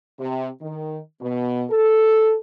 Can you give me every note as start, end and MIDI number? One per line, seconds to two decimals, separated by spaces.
0.20 0.49 48
0.62 0.99 51
1.22 1.64 47
1.70 2.35 69